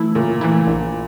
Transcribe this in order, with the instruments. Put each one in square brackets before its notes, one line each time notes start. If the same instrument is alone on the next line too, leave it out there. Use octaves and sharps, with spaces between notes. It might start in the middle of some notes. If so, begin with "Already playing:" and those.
Already playing: [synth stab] E3 A3 E4
[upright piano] A#2 [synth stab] C#3
[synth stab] E3 A3 E4
A#1